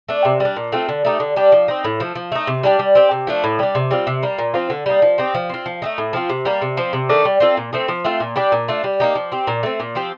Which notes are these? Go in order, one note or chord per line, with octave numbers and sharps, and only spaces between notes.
A3 D4
C3
G3 D4
A#2
A3 C4 F4
D3
A3 D#4 G4
D3
G3 D4 G4
F3
C4 D#4
A2
F3 A3
F3
A3 D#4
C3
G3 D4 G4
G3
C4 G4
C3
F3 A3 D4
A2
G3 D4
C3
G3 C4 F4
C3
G3 A#3
A#2
F3 C4 F4
D3
G3 A#3 D#4
F3
C4 D#4 G4
F3
C4 F4
F3
A3 C4 D#4
A2
F3 C4 F4
C3
G3 A#3
C3
F3 C4
C3
D#3 A3 D4
G3
C4 F4 A4
A#2
F3 A3 C4
F3
A3 C4 F4
A#2
G3 D4 G4
A#2
A3 D4 F4
G3
A#3 D#4 G4
F3
C4 G4
A#2
A3 C4
A#2
F3 C4 G4